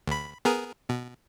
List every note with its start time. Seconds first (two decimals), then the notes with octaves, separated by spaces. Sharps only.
0.08 D2 B5
0.45 B3 G#4 A#4
0.89 B2